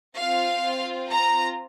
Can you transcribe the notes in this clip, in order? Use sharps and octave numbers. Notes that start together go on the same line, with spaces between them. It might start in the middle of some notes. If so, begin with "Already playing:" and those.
C4 F4 F5
A#5